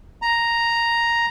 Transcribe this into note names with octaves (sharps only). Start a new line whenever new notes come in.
A#5